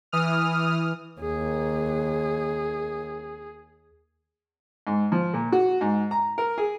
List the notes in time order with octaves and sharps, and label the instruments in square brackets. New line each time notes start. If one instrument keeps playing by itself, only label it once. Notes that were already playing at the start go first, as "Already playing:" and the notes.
[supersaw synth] E3 D#6 F6
[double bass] D#2 [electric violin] G#4
[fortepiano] G#2
F3
A#2
F#4
G#2
A#5
A#4
G#4